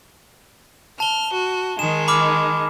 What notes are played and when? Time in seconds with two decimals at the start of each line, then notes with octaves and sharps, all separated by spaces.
1.00 A5 F6 G7
1.34 F#4
1.79 D#3 G#3 E7
2.08 B5 D6 F6